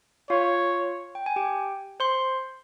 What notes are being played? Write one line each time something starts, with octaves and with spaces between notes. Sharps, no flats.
F4 C#5 F5
G5
G#5
G4 G5
C5 C6